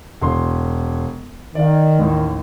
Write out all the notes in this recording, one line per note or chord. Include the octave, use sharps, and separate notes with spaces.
E1 C6
D#3 D5 F5
A1 D#2